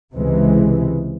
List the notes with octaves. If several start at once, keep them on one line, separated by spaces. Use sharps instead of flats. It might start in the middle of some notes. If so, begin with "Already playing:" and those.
C#2 C3 E3 G#3